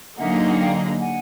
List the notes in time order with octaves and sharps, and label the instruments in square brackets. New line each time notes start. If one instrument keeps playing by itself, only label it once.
[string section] D3 F#3 A#3 D#4 G#4 [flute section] E5 F#5
[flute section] F#5
F5 G5
F#5 G#5